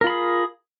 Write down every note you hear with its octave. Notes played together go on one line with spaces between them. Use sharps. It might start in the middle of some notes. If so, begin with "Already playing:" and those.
F4 G#4 A#4 B5